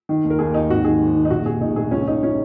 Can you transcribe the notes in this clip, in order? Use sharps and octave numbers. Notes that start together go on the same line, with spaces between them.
D#3
D#2
A#4
D#2 G#4
D#2 D#4
G#1 F#4
D#3 G#4
G#2
D#3
D#4
A#1 F#4
A#1 G#4
A#1 D#4
A#1 G#4
C#2 C#4
C#2 D#4
C#4